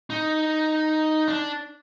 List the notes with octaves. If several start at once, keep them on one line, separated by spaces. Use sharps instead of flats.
D#4
D4